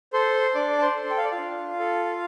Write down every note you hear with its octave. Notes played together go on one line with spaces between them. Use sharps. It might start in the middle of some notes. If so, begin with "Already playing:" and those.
A4 C5 C6
D4 D5 D6
A5
C5 C6
A4
G5
F5
D5
F4 F5
D4
A4